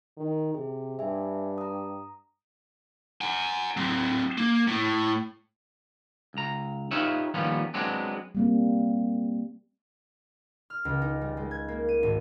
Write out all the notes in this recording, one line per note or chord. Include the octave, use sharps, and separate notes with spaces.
D#3
C3 G#4
G2 E5 G#5
A#5 D#6
F#5 G#5
F#3 C4
A#3
A2
C#2 A#5
D#4 F4 G4 B4 C#5 E5
D#2 F3 G3 A#3 B3 C#4
F#3 G#3 B3 C4 D4
G3 A#3 C4
F6
C#2
D#4
G3
G#3
G#6
A#3
D#7
G#1